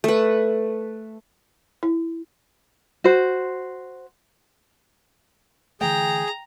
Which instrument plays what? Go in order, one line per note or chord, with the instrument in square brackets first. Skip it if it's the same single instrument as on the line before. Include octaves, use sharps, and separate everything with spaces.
[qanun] A3 B4
[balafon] E4
[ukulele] F#4 C5
[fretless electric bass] D3 E3 A3 [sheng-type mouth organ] G#4 [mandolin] G5 [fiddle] A#5